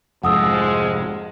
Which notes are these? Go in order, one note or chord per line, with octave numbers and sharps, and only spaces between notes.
F1 F2 G#2 F3 G#3 F#5 D#6 E6